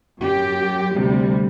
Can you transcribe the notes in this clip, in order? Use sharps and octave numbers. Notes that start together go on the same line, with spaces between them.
F#2 G4
D2 C3 G3